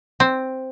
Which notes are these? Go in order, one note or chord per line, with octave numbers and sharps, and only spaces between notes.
C4